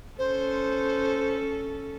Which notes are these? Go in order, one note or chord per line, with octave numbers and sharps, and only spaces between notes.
C#4 A4 C5